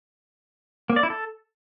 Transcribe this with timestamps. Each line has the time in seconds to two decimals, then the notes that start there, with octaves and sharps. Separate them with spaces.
0.90 A#3
0.96 D5
1.03 E4
1.10 A4